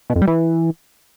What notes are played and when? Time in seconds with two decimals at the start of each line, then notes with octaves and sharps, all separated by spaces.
0.10 B2
0.16 F2
0.22 G3
0.28 E3